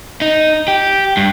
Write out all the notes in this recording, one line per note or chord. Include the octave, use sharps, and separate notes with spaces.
D#4
G4
G2